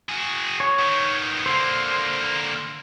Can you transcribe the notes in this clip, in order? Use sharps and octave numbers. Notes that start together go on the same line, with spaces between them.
F#4 G#4
C#5
D#3 B3
D3 A#3 C5